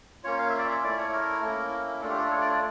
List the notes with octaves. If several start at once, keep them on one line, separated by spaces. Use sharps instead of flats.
A#3 C#4 F4 C#5
F5
E5
D5
E5
A3 E4 D5
C#5
A#4
A#3 C#4 E4
A3 D4 F4 A4
G4
A4
C#5
D5
D5